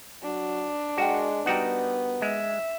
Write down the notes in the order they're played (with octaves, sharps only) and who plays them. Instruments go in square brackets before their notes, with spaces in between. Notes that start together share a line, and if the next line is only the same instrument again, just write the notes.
[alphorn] F#3 [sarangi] D4
[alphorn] G#3 [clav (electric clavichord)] F#4 [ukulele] A#4 F#5 G5
[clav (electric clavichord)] G3 F#4 F#5 [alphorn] B3 [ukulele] D#4 A#4 G5
[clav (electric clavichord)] G#3 [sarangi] E5